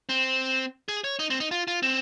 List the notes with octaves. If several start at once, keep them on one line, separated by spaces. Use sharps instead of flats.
C4
G#4
C#5
D#4
C4
D#4
F4
F4
C4